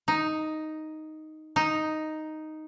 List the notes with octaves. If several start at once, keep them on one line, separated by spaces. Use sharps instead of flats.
D#4
D#4